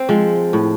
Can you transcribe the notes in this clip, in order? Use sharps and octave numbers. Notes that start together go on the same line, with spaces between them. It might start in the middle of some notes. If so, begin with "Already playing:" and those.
Already playing: C4 C5
F3 G#3
A2